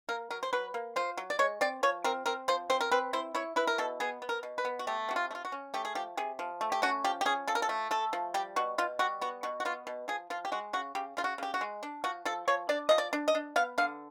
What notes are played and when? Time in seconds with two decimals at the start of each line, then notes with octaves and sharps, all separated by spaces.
0.09 A#3 A#4
0.30 F#3 A#4
0.43 C5
0.53 F#3 B4
0.74 A#3
0.96 F4 C5
1.17 F#3
1.30 D5
1.39 G#3 C#5
1.61 C4 D5
1.83 F3 C#5
2.04 C4 A#4
2.26 C4 A#4
2.48 F3 C5
2.70 C4 C5
2.81 A#4
2.91 C4 B4
3.13 E4 C5
3.35 E4 C#5
3.56 E4 B4
3.67 A#4
3.78 B2 A4
4.00 B3 G#4
4.22 B3
4.29 A#4
4.43 B2
4.58 B4
4.65 B3
4.79 F#4
4.87 A3 G4
5.09 C3 F#4
5.16 F4
5.31 A3
5.35 F4
5.45 F#4
5.52 C#4
5.74 A3 G4
5.85 G#4
5.95 F3 G4
6.17 C3 G#4
6.39 F3
6.61 A3
6.72 G4
6.82 C#4 F#4
7.04 F3 G4
7.21 G4
7.25 C#4 G#4
7.47 F3 A4
7.55 A#4
7.62 A4
7.69 A3
7.91 A3 A4
8.13 F3
8.34 G3 G4
8.56 B2 F#4
8.78 B2 F4
8.99 G3 F#4
9.21 B3 F#4
9.43 B2 F#4
9.60 F#4
9.65 B3 F4
9.87 B2
10.08 F3 G#4
10.30 F3 F4
10.45 G4
10.52 G#3 F#4
10.73 C#3 F#4
10.95 C#3 G4
11.17 C#3 F4
11.24 F#4
11.38 C#3 G4
11.54 F#4
11.61 G#3
11.83 D4
12.04 F3 F#4
12.25 F3 A4
12.48 F3 C#5
12.69 D4 D5
12.89 F3 D#5
12.98 D5
13.13 D4
13.28 D#5
13.35 D4
13.56 B3 F5
13.78 D3 F5